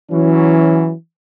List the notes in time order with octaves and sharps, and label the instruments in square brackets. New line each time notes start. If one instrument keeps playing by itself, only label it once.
[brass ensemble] E3 F#3 C#4